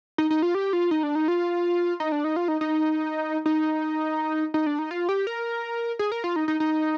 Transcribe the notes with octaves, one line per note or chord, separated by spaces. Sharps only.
D#4
D#4
F4
G4
F4
D#4
D4
D#4
F4
D#4
D4
D#4
F4
D#4
D#4
D#4
D#4
D4
D#4
F4
G4
A#4
G#4
A#4
F4
D#4
D#4
D#4